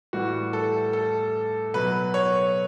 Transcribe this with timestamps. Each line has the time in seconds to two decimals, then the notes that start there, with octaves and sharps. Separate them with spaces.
0.13 A2 E3 G3 F#4
0.53 A4
0.93 A4
1.74 B2 F#3 B4
2.14 C#5